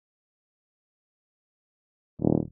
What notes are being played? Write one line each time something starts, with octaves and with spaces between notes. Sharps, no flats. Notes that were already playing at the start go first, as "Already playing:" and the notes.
D#1